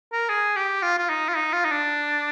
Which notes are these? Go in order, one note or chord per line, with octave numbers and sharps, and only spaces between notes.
A#4
G#4
G4
F4
F4
D#4
F4
D#4
F4
D#4
D4